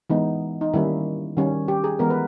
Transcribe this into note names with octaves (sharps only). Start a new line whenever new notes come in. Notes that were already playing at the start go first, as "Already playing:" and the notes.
E3 G#3 B3 D#4
D#4
D#3 G3 A#3 C#4 E4
D#3 G3 C#4
G4
G#4
E3 G#3 B3 A#4
B4